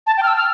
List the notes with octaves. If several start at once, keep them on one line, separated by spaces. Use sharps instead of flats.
A5
G5
F6
E6
F6